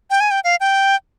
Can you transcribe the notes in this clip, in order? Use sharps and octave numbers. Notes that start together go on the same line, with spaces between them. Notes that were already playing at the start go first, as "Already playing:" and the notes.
G5
G#5
G5
F5
G5